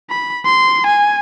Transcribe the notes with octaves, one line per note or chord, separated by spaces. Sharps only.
B5
C6
G#5